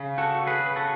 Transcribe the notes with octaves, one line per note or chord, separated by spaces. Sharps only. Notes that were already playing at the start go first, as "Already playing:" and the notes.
Already playing: C#3
F#4 A4
G#4 B4
B4
F#4 A4